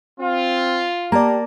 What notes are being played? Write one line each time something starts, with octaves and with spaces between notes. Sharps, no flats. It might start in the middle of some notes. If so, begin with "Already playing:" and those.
C4 F4
A#3 G4 D5 A5 A#5